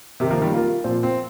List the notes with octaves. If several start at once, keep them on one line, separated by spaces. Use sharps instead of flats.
C3 D#3 C4 G4 A#4
F3 A#3
D#3 G3
A#3 F4 A#4
A#2 F3 C4 F4 C5
C4